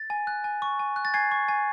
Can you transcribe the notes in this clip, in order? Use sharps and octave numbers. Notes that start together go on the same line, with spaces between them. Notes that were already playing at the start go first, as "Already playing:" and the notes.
Already playing: A6
G#5
F#6
G#5
C#6
G#5
F#6
A6
G#5 G#6 C7
C#6
G#5